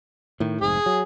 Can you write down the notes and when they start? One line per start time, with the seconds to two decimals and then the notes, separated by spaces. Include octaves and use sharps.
0.40 A2 D#3
0.61 F1 G#2 G#4
0.86 F#3